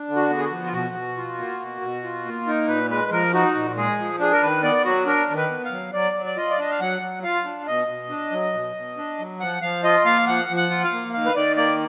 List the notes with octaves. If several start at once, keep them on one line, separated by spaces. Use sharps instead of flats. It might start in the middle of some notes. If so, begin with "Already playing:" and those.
Already playing: D4
D3
F#4
B3
G#4
F#4
F3
F4
B2 F#4
B2
F4
A#3
B2
B2
F4
A#3
D#4 A#4
A#2 B4
G#3 B4
F3 A#4
D#4 F#4
A#2
G#3 G#4
F3
D4 G#4
A#4
D#3 B4
B3 D5
F#3 F#4
D4 A#4
D#3
B4
B3
F5
F#3
F#3 D5
F#3
D5
F4 D#5
D5
D4 D#5
F5
F#3 F#5
F#3
F4 F5
D4
B2 D#5
B2
D4
F#3
B2
B2
D4
F#3
F3 F#5
F3 F5
F4 D#5
A#3 F5
F3 F#5
F3
F#5
F4
F5
A#3
D#3 F5
B4
D#3 D5
A#3 D5